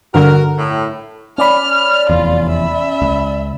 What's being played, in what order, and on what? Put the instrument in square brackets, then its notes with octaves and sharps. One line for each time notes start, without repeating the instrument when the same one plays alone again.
[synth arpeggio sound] G2 D3 [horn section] F#4 A#4
[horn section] A2
[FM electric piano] C#4 D5 B5 [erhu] F6
[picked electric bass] F1 E2 [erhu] F4
[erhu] E5
[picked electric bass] C#2